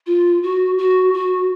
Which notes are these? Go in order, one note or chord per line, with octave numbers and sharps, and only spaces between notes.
F4
F#4
F#4
F#4